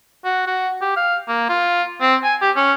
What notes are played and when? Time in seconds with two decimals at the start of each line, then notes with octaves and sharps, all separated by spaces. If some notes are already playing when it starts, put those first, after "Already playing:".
0.25 F#4
0.47 F#4
0.81 G4
0.96 F5
1.28 A#3
1.49 F4
2.01 C4
2.23 G#5
2.41 G4
2.56 C#4